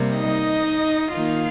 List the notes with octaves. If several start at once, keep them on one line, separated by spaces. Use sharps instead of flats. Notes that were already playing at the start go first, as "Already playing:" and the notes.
Already playing: C3 G3 A#3
D#4 D#5
D#3 A#3 D#4 F4 F5